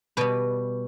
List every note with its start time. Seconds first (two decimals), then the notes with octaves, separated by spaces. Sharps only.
0.17 B2 G3 B4